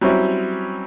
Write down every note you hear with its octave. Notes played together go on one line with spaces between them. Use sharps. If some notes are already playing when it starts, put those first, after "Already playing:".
F#3 G3 C4 C#4 E4